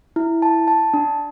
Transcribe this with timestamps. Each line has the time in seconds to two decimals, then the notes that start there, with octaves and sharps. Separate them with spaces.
0.16 E4
0.42 A5
0.68 A5
0.94 D4